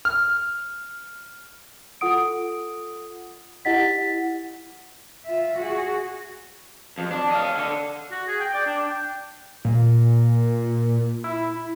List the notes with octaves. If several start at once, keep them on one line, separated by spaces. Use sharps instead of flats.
F6
F4 A4 F#5 D#6 D7
E4 G4 D#5 F#5 A6 B6
F4 E5
F#4 G#4
F2
D4
D#5 F5
D3
F#4
G#4
G5
D5
D4
G5
A#2
E4